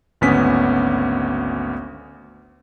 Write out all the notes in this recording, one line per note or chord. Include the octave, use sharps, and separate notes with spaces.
G#1 D2 B3 C#4 G#5 B6